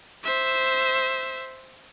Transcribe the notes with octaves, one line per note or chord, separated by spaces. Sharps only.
C5 E5